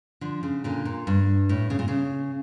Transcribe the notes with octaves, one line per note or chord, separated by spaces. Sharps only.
D3 F3
C#3
A#2 D3
A#2
G2
A2
C#3
A#2
C#3